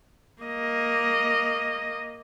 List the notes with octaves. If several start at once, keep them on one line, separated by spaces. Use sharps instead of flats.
A#3 D#5